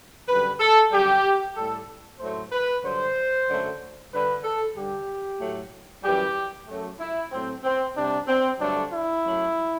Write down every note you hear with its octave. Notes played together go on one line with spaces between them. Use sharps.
F#2 D3 G3 B4
A4
F#2 D3 G3 G4
A2 G3 A4
A2 F#3 A3 C5
B4
G2 D3 F#3 C5
F#2 D3 F#3 A3
G2 D3 G3 B4
A4
G2 D3 G3 G4
A2 F#3 A3
F#2 E3 G3 G4
F#2 F#3 A3
E4
A2 F#3 A3 C4
C4
C3 G3 D4
C4
G2 D3 F#3 A3 D4
E4
F#2 F#3 A3